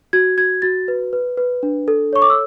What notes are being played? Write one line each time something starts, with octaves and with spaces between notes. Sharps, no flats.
F#4 G#6
F#4 G#6
F#4 A6
B4
B4
B4
D4
A4
C#5 C#6
D6
E6